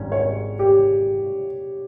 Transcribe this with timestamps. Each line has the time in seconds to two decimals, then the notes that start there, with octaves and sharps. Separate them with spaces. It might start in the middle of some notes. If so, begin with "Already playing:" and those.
Already playing: G#1 G#2 G3 C#4
0.12 C#5
0.59 G4